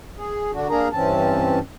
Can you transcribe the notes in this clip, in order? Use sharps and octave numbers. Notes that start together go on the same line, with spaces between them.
G#4
D3 D4 F#4
A#3 D4 G#4 A#4 A#5
G2 E3 C4 C#4 A5